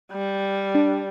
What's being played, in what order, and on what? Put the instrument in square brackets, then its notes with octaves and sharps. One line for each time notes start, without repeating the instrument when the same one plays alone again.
[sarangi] G3
[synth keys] D4